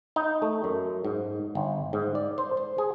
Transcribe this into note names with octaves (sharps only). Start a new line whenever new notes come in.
D#4
A3
F#2
G#2
G1
G#2
D5
C5
C5
G#4